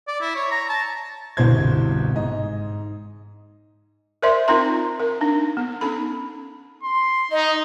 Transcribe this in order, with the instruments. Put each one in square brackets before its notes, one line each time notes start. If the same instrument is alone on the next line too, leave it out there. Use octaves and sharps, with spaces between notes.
[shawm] D5
E4
C#5
A#5
A5
[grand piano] G1 C2 B2 E3 C5 G#6
G#2 D#5
[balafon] A#4 C5 D5 E5 C6
C4 D#4 F4 A#4 A#5 C6
A#4
D4 D#4
B3
C#4 D#4 A4 B5
[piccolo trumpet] C6
[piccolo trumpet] D#4 [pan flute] D#5